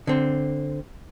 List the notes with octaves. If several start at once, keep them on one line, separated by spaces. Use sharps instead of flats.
D3 C4